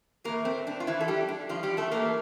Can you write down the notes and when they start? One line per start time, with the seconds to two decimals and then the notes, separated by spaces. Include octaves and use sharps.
0.24 A2 E3 A3 A#3 A#4
0.45 C4
0.67 D4
0.80 F4
0.87 E3 E4
1.01 A4
1.08 G3 G4
1.28 D4
1.49 F3 F4
1.63 G3 G4
1.77 A3 A4
1.91 A2 E3 A3 A#3 A#4